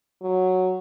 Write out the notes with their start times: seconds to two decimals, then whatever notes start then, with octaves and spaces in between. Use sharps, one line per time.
0.22 F#3